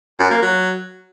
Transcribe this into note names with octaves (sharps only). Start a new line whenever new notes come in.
F#2
A#3
F#3